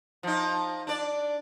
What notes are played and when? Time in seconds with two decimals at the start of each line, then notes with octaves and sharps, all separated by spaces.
0.23 F3 D#4
0.87 D4 D5